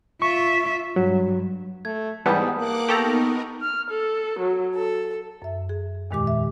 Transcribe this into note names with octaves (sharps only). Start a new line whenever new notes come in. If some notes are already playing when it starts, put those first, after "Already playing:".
F4 E5 C#6
G2 F#3
A3 G#6
G#2 E3 G3 B3 A5 D#6 G6
A#3 F#5 D6 F#6
B3 D#4 G4 A4 A#4 A#5 C#6
F6
A4
F#3
A4
F#2 E5
G#4
E2 A#2 D#3 G#3 G4 D6
E5